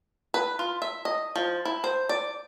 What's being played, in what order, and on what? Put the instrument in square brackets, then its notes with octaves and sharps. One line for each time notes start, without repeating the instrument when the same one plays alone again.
[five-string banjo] B4
F4
E5
D#5
F3
E4
C5
D5